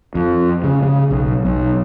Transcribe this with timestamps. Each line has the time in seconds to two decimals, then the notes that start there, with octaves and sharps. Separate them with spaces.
0.15 F2
0.64 C#3
0.83 C#3
1.11 B1
1.45 B1